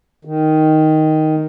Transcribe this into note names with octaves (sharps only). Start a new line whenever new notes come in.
D#3